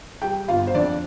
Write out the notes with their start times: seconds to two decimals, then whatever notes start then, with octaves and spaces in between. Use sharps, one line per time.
0.22 G3 G4 G5
0.48 G1 F4 F5
0.67 C5
0.75 F2 D4 D5